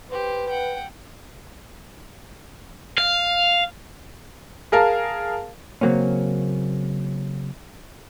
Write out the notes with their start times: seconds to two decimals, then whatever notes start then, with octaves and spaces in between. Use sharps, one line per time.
0.11 G4 B4 C5
0.49 F#5 G5
2.98 F5
4.72 G#4 A#4 F5 A5
5.81 C#3 F#3 A#3 C4 C#4